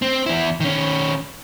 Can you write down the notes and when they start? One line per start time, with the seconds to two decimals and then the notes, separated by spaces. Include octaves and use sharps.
0.02 C4
0.26 E2 E4
0.60 D#3 C#4